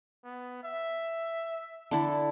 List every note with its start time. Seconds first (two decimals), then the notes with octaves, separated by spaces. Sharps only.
0.24 B3
0.63 E5
1.91 D3 E4 A4